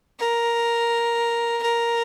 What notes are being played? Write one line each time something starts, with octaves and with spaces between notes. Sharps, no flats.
A#4
A#4